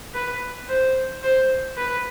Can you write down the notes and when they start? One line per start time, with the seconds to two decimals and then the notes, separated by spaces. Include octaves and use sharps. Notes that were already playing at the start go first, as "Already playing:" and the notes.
0.14 B4
0.68 C5
1.23 C5
1.77 B4